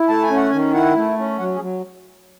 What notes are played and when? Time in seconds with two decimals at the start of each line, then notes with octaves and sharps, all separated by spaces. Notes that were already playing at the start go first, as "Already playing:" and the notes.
Already playing: E4
0.08 A3 A5
0.23 G#5
0.30 C#4
0.36 F#5
0.50 D#3 G#5
0.73 E4 F#5
0.96 A3
1.18 C#4
1.39 F#3 F#5
1.55 G#4
1.61 F#3